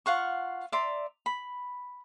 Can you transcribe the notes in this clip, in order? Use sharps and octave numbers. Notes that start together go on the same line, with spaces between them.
F4 F5 F#5 C#6
D5 E5 A#5 C6
B5